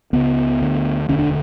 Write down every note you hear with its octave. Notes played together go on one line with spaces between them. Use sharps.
C#2 C#3 B3
D2 D3
E1 D2 D3 C#4
D4